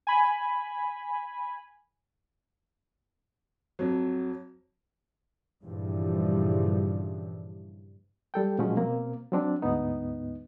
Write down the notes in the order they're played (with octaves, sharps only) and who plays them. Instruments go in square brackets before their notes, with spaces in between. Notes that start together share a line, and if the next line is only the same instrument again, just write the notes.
[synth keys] G#5 B5
[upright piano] F2 F#3
[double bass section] G2 A#2 C#3 E3 F3 G3
[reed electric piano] G3 A4 G5
A#2 F3 F#3 G#3 C#4
B2 A#3 C4
F#3 C4 D4
D2 G#2 B3 D#4